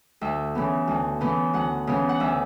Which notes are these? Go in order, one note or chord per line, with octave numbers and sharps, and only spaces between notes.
D2 E5
C#3 E3 B3
D2
C#3 E3 B3
D2 F#5
C#3 E3 B3
F#5
D2 E5